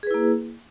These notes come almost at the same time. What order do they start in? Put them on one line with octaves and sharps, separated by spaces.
G#4 B4 E4 A#3